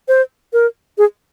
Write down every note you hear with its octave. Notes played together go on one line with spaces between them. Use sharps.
C5
A#4
G#4